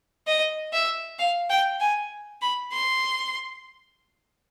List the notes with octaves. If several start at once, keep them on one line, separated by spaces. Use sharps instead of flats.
D#5
E5
F5
G5
G#5
B5
C6